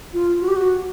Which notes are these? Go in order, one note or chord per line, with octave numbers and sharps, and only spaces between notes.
F4
F#4
G4
F#4